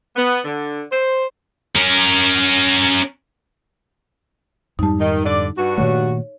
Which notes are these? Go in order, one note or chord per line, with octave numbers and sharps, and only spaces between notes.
B3
D3
C5
C#4 A#4
F2 G#2 G3 D#4 A5
D#3
D3 D5
G2 F#4
A#2 D#3 A3 C#5